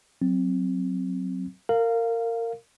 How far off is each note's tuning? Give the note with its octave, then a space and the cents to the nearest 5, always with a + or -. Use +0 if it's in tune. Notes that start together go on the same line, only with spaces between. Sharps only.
F#3 +0 C4 +0
A#4 -25 F5 +0